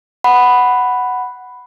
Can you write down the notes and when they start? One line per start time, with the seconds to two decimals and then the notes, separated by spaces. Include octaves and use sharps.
0.24 F#5 B5